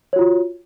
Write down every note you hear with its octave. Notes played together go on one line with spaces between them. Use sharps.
F4 F#4 C#5